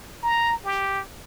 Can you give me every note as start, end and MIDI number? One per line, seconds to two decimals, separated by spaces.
0.23 0.55 82
0.65 1.01 67